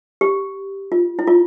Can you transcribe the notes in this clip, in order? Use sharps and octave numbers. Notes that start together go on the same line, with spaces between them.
G4
F4
E4
F4